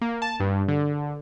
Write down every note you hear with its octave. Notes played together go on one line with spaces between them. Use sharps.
A#3
A5
G2
D3